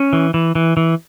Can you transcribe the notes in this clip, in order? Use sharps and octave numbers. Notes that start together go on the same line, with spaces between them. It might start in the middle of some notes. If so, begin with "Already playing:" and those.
Already playing: C#4
E3
E3
E3
E3